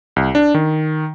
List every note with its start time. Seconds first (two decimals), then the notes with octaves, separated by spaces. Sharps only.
0.16 C2
0.35 D4
0.54 D#3